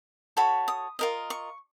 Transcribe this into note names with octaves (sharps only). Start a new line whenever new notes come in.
F#4 A4 C#5 B5
D#6
F4 A#4 D#5
C#6